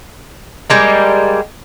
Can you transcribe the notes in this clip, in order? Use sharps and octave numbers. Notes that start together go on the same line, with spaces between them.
G3 G#3 A#3